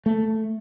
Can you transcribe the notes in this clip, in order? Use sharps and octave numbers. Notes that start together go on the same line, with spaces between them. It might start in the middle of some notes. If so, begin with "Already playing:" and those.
A3